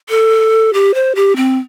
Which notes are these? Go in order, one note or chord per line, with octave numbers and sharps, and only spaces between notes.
A4
G4
C5
G4
C4